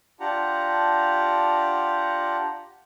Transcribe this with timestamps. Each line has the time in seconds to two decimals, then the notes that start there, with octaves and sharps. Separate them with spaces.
0.20 D4 F4 G4 F#5 A#5